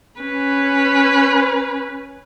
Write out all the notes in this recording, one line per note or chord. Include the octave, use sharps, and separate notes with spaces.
C#4 B4